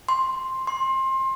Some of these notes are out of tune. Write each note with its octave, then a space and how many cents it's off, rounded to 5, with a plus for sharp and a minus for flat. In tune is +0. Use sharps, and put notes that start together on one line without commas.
C6 +5
C6 +25